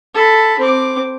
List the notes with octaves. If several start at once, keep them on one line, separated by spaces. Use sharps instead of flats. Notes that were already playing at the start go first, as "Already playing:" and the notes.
A4 B5
C4 D6